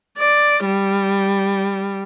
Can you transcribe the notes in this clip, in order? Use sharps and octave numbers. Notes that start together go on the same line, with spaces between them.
D5
G3